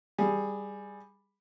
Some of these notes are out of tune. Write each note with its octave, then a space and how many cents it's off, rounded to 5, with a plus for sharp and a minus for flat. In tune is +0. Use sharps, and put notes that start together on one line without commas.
G3 +10 G#4 +0